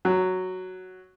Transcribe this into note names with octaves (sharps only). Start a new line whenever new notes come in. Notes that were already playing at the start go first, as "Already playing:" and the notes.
F#3